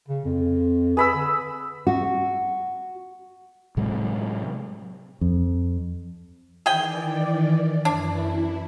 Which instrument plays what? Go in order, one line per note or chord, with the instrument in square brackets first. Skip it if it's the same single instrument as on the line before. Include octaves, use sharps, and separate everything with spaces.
[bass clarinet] C#3
F2
[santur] G#4 B5 E6 [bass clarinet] B4
[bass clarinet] D3
[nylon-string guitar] F#4
[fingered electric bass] A2 C3 F#3 G#3
F2
[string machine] D#3 E3 D5 [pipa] G#4 G5
[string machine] F#2 E3 E4 [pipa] D4
[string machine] E4